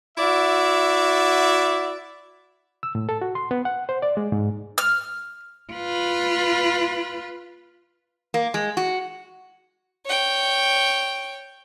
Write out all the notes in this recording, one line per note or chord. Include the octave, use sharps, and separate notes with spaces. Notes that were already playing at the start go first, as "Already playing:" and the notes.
E4 F#4 D5 E5
E6
A2
A4
F#4
C6
B3
F#5
C5
D5
G#3
G#2
F6
F4 B4
A#3
G#3
F#4
C#5 G5